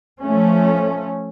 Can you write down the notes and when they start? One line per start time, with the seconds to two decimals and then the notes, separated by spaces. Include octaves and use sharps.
0.22 F3 A3 C#4